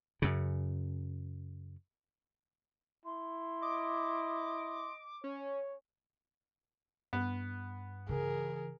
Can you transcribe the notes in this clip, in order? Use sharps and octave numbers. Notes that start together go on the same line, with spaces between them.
F#2 C#3
E4 C6
D#5 D6
C#4 C#5
G2 B3
C#3 E3 G#4 A#4